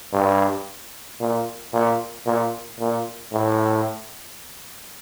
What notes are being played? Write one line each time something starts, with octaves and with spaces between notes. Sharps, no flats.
G2
A#2
A#2
A#2
A#2
A2